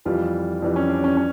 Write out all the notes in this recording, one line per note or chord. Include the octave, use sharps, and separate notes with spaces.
F2 E3 G3 F4
F2 E3 G3 D4
C#4
D4
C#4
C#4